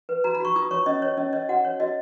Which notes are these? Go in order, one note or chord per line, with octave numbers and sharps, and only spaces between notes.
B4
F#4 A#5
B5
F#4 C#6
F4 D#6
C#5 C#6
C#4 D#5
C#5
C#4 D#5
C#5 D#5
F#4 F#5
C#5
F#4 D#5